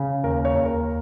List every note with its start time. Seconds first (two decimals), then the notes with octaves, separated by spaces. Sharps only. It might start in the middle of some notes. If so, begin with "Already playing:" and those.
Already playing: C#3
0.23 D#2 A#4
0.45 C#5
0.55 D#2
0.65 A#4